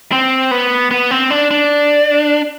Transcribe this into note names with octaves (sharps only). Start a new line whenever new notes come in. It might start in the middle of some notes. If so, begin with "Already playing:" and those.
C4
B3
B3
C4
D4
D4